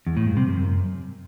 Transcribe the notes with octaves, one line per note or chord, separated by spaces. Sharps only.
E2
A2
G2
C3
F#2